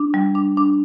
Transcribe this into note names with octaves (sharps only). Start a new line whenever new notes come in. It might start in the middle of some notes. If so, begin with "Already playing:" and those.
Already playing: D4
G3
D4
D4